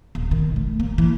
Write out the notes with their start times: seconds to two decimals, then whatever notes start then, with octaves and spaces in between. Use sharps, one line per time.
0.15 D#1
0.31 D#3
0.56 A3
0.80 A#3
0.98 E3